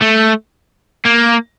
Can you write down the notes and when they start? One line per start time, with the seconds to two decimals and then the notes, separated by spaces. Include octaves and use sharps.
0.02 A3
1.05 A#3